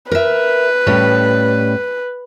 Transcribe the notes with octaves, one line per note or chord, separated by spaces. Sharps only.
A#4 B4 E5
A2 G3 C#4